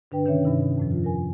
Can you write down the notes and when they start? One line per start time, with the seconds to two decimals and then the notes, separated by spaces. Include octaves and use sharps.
0.11 G2 D3 D4 B4 G5
0.25 C3 D#3 C#4 C#5 E5
0.45 G2 C3 D#4
0.78 F2 A2 F3
0.92 F4
1.04 A#4 G#5